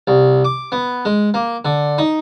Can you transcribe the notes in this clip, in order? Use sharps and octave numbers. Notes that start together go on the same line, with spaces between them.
C2
D6
B3
G#3
A#3
D3
D#4